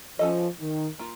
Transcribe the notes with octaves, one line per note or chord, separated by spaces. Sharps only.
F3 C#4 A4 D#5
D#3
A#3 F4